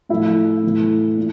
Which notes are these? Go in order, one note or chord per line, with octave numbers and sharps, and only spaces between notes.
A2 F3 E4
A2 E3
A#2